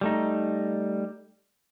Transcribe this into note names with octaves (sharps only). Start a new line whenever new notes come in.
G3 A3 D#4